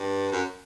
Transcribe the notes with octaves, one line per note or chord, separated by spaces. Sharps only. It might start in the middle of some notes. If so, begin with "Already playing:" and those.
Already playing: G2
F#2